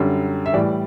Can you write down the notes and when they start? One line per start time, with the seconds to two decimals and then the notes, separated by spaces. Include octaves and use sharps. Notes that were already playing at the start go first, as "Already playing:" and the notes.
Already playing: F#2 D3 G3
0.46 E5
0.53 A2 E3 G3 D5